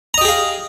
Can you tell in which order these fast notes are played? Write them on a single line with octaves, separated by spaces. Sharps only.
A#5 D#5 G4 G#4 F5